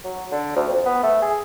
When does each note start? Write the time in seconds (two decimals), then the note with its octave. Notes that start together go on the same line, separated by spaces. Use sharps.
0.04 F#3
0.32 D3
0.56 D2
0.69 F2
0.86 B3
1.03 A3
1.22 G#4